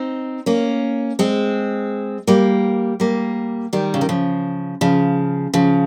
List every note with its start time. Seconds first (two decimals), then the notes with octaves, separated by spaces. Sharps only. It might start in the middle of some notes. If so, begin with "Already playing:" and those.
Already playing: C4 D#4
0.46 A#3 C#4
1.19 G#3 C4
2.27 G3 A#3
3.00 G3 A#3
3.73 D#3 G3
3.94 C#3
4.01 D#3
4.09 C#3 F3
4.81 C#3 F3
5.54 C#3 F3